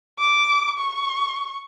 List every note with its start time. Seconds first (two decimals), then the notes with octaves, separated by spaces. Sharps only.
0.19 D6
0.78 C#6